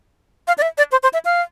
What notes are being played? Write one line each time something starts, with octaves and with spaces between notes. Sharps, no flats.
F5
D5
E5
D5
C5
C5
E5
F5